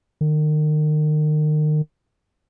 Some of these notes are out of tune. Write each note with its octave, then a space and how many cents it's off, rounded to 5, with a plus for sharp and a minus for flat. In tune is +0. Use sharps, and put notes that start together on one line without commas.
D#3 -35